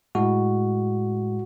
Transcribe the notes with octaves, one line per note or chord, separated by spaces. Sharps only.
A2 G#3 F#4